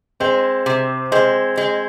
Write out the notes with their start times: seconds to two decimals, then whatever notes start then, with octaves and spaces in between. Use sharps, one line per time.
0.20 G#3 C4 C5
0.66 C3
1.12 G#3 C4 C5
1.57 G#3